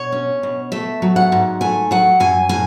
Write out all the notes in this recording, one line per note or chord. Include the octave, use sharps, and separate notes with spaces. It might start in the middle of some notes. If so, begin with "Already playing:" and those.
Already playing: B2 C#5
C#4
B2
A3 E5
F#3
F#5
G#2
A3 G#5
F#3 F#5
F#2 G#5
A2 G#5